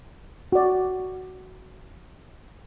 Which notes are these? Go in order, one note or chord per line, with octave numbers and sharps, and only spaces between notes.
F#4 D5